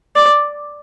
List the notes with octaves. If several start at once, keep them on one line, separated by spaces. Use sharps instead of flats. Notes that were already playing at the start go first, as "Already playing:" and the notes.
D5